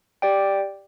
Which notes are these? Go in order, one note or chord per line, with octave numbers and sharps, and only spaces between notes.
G4 D5 G5